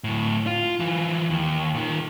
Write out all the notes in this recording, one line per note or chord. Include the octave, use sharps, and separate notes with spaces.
D2 A2
F4
E3 F3
D#2
A#2 D#3